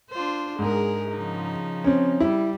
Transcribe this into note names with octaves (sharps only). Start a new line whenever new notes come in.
D4 F4 C5
G#2 G#3 G#4 A#4
C#3 F3 D#4
C4 C#4
G3 E4